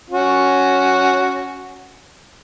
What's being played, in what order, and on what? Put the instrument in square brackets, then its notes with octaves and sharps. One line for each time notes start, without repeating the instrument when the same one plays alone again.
[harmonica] C#4 F#4